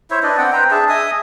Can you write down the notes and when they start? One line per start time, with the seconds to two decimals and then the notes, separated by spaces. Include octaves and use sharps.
0.10 E4 C5 C#5 E5
0.23 D4 B4 D5 D#5
0.38 C4 F#5 G5
0.52 B4 C5 G5 A#5
0.71 D4 G#4 E5 A5
0.89 D#5 E5 G#5 D#6